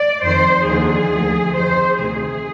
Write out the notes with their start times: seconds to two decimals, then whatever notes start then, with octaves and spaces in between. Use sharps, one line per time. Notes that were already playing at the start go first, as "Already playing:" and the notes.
Already playing: D5
0.24 F2 D#3 C5
0.68 D#2 D3 F3 G#4
1.11 D2 D3 F3
1.55 F2 D#3 C5
1.99 D2 C3 D#3 G#4